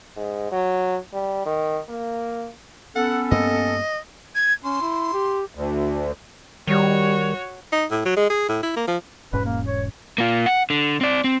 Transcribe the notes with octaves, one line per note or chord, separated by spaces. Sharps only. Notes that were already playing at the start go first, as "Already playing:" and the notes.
G#2
F#3
G3
D#3
A#3
B3 C#4 A4 F#5
G2 A#3 C4 D#5
G#6
C#4 C6
E4
G4
D2
D#3 G3 F#4 C#5
D#4
A2
F#3
G#3
G#4
A2
E4
A#3
F3
E1 G#2 C#4 B4
A#3
C#5
A#3 F4
F#5
D3
C4 D5
C4